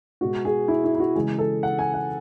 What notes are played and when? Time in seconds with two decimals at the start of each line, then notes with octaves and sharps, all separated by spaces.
0.21 B2 G#3 F#4
0.45 G#4
0.68 E4
0.84 E4
0.95 E4
1.00 F#4
1.15 C#3 E3 G#3 G#4
1.39 A4
1.63 F#5
1.79 G#5
1.94 F#5